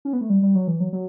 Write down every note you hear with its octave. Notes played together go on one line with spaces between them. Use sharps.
C#4
B3
A3
G3
G3
F#3
E3
F#3
F#3